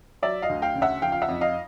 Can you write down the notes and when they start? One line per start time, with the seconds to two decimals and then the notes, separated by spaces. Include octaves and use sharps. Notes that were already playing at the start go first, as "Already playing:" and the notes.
0.22 F#3 D5 E5
0.42 D#5 F5
0.49 D2
0.62 F5 G5
0.75 C#3
0.82 E5 F#5
1.02 F3 F5 G5
1.12 F5
1.22 E5 F#5
1.28 F2
1.41 D#5 F5